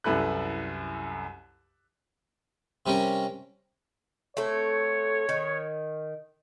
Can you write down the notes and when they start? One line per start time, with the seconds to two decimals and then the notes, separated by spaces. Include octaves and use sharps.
0.04 C2 F#2 E4 A4 B4 F#6
2.86 C3 G3 C#4 A#4
4.37 A3 C4 A4 C#5
5.29 D#3